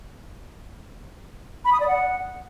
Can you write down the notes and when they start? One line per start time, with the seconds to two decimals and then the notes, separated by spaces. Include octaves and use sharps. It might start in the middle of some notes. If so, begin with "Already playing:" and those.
1.65 B5
1.73 D#6
1.80 D5
1.88 F#5